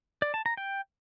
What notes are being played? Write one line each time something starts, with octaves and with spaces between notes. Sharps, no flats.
D5
A5
A#5
G5